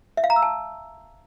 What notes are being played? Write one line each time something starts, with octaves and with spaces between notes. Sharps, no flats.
E5
F5
A#5
E6
A5